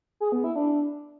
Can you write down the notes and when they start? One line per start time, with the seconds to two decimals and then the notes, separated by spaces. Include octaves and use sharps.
0.20 G#4
0.32 B3
0.44 E4
0.56 D4